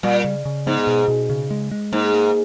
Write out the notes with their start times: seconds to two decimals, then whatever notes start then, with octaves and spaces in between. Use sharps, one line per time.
0.03 A#2 G3
0.24 C#3
0.45 C#3
0.66 G#2 B3
0.87 B2
1.08 B2
1.29 C#3
1.51 G#3
1.71 G#3
1.92 G#2 A#3
2.14 A#3